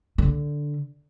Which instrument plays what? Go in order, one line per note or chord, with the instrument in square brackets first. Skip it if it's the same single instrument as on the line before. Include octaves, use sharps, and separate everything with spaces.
[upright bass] D3